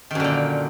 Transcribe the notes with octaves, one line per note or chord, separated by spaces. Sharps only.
F#2 A#2 D3 D#3